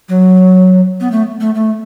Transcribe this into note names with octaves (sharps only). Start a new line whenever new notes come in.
F#3
B3
A3
A3
A3